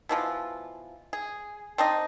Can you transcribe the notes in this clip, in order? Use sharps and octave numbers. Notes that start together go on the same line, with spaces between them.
B2 E3 F3 F4
G#4
C4 D4 D#4 D#5